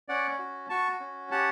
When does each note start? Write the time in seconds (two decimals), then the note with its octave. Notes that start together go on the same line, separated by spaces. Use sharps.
0.08 C#4 D5 F#5
0.39 F#4
0.69 F#4 A5 C#6
1.00 C#4
1.31 G4 F#5 A5